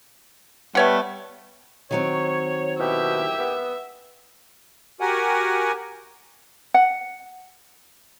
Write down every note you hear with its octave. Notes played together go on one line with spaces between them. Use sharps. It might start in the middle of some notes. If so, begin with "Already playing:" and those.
G3 A3 B3 C#5 F#5
D#3 F#3 C4 C#5
D#2 B2 E4 G4 E5
B3
F#4 G4 A#4 F#5 G#5
F#5